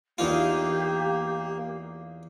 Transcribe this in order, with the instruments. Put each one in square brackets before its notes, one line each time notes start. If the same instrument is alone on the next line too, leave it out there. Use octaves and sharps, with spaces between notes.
[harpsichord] E2 D#4 F4 [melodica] A#3 [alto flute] G4